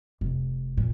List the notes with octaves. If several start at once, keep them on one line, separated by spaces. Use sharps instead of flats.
F1
A#2